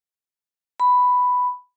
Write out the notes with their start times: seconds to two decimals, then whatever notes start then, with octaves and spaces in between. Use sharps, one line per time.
0.80 B5